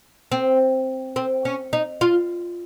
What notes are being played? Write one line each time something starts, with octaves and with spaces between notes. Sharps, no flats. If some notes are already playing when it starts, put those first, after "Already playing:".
C4
C4
C#4
D#4
F4